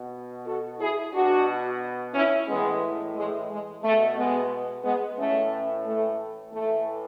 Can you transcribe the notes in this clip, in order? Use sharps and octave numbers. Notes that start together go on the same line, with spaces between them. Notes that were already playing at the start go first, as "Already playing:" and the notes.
Already playing: B2
F#4 A4
E4 G#4
B2 D4 F#4
C#4 E4
A2 E3 G#3 B3
G#3
G#3
B2 A3
G#3 B3
G#3 B3
A2 E3 A3 C#4
A3
A2 E3 A3